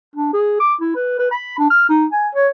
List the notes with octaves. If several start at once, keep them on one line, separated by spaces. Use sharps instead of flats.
D4
G#4
D6
E4
B4
B4
B5
D4
F6
D#4
G#5
C#5